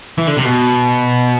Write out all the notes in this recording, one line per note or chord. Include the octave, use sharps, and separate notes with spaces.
E3
D3
C3
B2